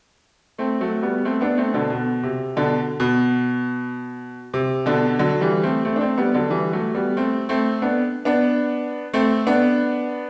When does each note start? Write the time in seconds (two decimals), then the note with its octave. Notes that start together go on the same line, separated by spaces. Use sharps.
0.58 A3 C4
0.81 F#3 A3
1.02 G3 B3
1.25 A3 C4
1.41 B3 D4
1.58 A3 C4
1.74 B2 D3
1.90 B2
2.23 C3
2.56 B2 D3
3.00 B2
4.54 C3
4.86 B2 D3
5.19 D3 F#3
5.41 E3 G3
5.63 A3 C4
5.85 A3 C4
5.96 D4
6.01 A3 C4
6.18 G3 B3
6.34 D3 F#3
6.50 E3 G3
6.73 F#3 A3
6.94 G3 B3
7.17 A3 C4
7.49 A3 C4
7.82 B3 D4
8.25 B3 D4
9.14 A3 C4
9.47 B3 D4